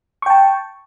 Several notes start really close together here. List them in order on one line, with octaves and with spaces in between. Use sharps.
C#6 G5 A5